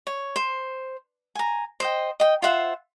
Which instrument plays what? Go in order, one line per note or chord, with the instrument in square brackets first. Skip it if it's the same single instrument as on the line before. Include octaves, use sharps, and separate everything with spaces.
[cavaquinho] C#5
C5
G#5 A#5
C5 D#5 G5
D#5 G5
F4 C5 E5 F#5